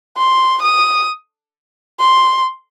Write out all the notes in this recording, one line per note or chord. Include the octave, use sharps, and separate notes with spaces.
C6
D#6
C6